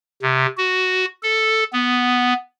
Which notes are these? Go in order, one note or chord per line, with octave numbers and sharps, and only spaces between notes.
C3
F#4
A4
B3